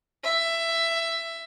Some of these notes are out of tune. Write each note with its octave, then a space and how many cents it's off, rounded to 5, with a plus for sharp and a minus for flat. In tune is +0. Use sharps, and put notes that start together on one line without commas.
E5 +15